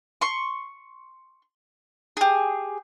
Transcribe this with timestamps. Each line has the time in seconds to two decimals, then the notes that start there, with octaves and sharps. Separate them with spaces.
0.21 C6 C#6
2.17 G4 G#4